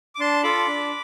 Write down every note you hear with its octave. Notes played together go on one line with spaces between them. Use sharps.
D6
D4 A5 C6
F4 A4 B5 D6
D4